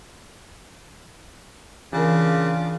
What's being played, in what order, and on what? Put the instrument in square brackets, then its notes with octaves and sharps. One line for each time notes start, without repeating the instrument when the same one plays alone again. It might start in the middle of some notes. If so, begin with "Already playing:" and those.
[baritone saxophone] C#3 [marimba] E3 A#4 [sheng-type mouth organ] D4 F4 D6